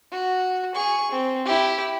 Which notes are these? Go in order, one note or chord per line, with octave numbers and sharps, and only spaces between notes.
F#4
G#4 C#6
C4
E4 G4